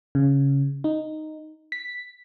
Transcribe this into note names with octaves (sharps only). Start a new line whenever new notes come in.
C#3
D#4
B6